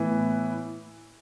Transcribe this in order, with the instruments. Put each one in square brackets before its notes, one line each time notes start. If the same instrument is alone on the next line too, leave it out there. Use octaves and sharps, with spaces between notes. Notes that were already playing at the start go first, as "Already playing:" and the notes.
Already playing: [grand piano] A2 E3 B3